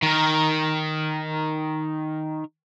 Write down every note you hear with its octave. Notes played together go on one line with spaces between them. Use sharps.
D#3 A#4